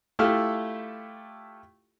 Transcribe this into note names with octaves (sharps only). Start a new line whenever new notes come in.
A3 E4 F4 G4 A4 F6